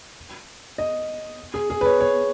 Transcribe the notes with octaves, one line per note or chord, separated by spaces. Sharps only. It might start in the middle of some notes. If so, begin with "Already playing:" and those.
D#5
G#4
G#4
B4
C#5
C#5